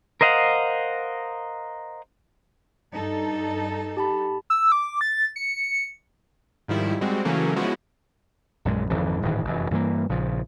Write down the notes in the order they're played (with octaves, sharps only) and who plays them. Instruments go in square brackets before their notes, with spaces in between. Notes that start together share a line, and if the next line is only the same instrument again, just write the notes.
[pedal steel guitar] A#4 C5 D#5 F5 F#5
[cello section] G2 D#4 A4
[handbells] G4 A5 B5
[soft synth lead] E6
D6
A6
C#7
[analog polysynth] G#2 D#3 F3 G3 E4
G3 G#3 C4 F#4
C#3 E3 F#3 A3 A#3 C#4
F3 G#3 B3 C#4 E4 F#4
[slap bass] A#1 F#2 G#3
G#1 F2 D3 E3
D1 G#2 D#3 E3
F1 F#2 E3
G2 E3 G#3 A#3
A#1 C#3 F3